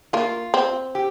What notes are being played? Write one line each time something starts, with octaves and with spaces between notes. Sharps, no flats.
A#3 F4
C4
G4